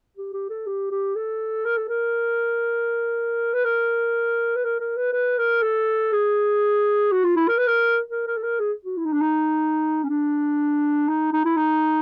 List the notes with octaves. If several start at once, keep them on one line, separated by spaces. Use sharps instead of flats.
G4
G4
A4
G4
G4
A4
A#4
A4
A#4
B4
A#4
B4
A#4
A#4
B4
B4
A#4
A4
G#4
F#4
F4
E4
A#4
B4
A#4
A#4
A#4
A4
A#4
G#4
F#4
E4
D#4
D4
D#4
C#4
D4
D#4
D#4
E4
D#4